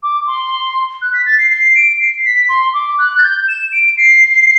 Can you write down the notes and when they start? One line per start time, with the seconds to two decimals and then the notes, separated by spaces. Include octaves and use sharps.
0.02 D6
0.26 C6
1.01 F#6
1.13 B6
1.26 A6
1.38 C7
1.50 C7
1.75 D7
1.99 C7
2.25 B6
2.48 C6
2.73 D6
2.98 F#6
3.18 A6
3.22 G6
3.48 E7
3.72 D7
3.97 C7